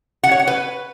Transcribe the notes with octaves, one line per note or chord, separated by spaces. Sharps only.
F#5
C#5
F#5
B4